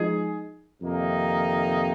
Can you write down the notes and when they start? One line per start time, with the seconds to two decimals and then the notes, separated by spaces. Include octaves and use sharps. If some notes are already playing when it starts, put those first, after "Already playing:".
Already playing: F3 G#3 D#4 G#4
0.81 F2 C3 D#3 A#3 D#4